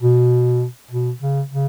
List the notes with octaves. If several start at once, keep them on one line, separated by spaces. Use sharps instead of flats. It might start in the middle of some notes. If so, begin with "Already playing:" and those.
B2
B2
C#3
C#3